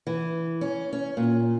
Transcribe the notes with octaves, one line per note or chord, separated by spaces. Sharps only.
E3
C#4
C#4
A#2